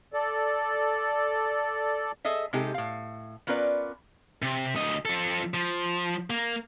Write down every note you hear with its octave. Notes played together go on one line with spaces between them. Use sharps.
A4 D5
G#4 A4 D#5 E5
C3 G#3 D#4 G4 A4
A2 F5
B3 C#4 F4 A#4 B4 D5
C3
D2 D#5
F3 A4
F3
A#3